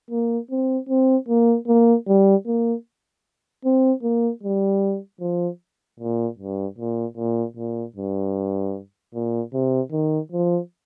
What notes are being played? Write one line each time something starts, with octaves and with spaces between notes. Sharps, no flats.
A#3
C4
C4
A#3
A#3
G3
A#3
C4
A#3
G3
F3
A#2
G2
A#2
A#2
A#2
G2
A#2
C3
D#3
F3